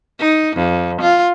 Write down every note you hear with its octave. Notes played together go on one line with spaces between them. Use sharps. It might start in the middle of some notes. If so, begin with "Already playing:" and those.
D#4
F2
F4